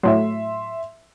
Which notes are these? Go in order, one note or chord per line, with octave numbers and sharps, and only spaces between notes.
A2 F#3 E5 C6